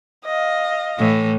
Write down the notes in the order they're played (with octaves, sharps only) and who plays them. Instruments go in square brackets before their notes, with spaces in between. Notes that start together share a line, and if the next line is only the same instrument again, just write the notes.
[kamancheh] D#5 F5
[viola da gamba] A2 E3